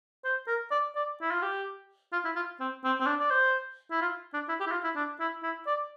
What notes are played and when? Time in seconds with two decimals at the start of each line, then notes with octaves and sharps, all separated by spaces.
0.24 C5
0.47 A#4
0.71 D5
0.95 D5
1.21 E4
1.31 F4
1.42 G4
2.12 F4
2.25 E4
2.36 F4
2.60 C4
2.84 C4
3.00 C4
3.06 D4
3.19 D5
3.31 C5
3.91 E4
4.01 F4
4.33 D4
4.49 E4
4.60 G4
4.67 E4
4.72 F4
4.84 E4
4.96 D4
5.20 E4
5.43 E4
5.67 D5